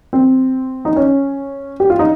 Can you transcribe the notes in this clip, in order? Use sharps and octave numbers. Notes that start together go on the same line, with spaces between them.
C4
D#4
C#4
G4
F4
D#4